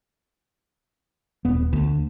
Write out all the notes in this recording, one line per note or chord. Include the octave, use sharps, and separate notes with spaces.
D#1 B3
D2